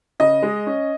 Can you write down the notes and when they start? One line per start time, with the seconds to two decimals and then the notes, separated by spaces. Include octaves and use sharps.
0.20 C#3 D#5
0.43 G#3
0.67 C#4